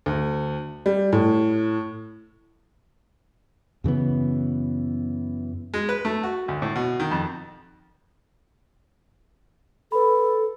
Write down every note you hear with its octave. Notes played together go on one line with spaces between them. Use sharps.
D2
G3
A2
F#2 C#3 E3 B3
G#3
B4
A3
F#4
D2
A2
B2
D#3
F2
A4 B4 B5